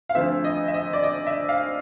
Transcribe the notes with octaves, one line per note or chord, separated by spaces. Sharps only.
F5
D2 D3 F3 A3 C4 E5
D#5
E5
D#5
D5
D#5
E5
F5